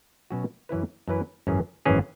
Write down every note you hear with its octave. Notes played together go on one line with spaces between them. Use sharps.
B2 F#3 C#4 F#4
F#2 E3 C#4 E4 B4
F#2 E3 C#4 E4 B4
G#1 F#2 E3 C#4 G#4
G#1 F#2 E3 C#4 G#4